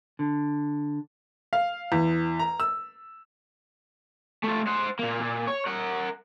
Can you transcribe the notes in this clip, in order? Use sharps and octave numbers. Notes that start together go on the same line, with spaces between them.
D3
F5
E2
A#5
E6
A3 F4
C5 F#5
A#2 A#3
A#2
C#5
A#4 F#5